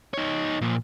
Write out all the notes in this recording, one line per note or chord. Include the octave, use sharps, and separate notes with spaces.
D#4 C#5
A#2 F3